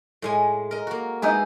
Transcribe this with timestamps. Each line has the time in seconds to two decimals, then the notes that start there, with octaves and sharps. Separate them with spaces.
0.22 A2 G#3 G#5
0.71 A#4 D#5
0.87 A#3 F#4
1.22 G#3 D#4 E4 G#4 B4